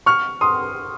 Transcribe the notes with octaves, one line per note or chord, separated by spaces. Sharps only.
C#6 F6
C6 D#6